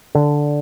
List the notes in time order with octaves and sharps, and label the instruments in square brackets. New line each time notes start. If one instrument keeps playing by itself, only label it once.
[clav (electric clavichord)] D3